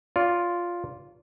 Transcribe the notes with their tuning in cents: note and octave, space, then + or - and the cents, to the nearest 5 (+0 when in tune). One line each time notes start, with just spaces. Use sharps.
F4 +0 D5 -30